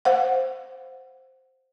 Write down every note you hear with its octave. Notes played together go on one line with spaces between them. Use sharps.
C5 F5 F#5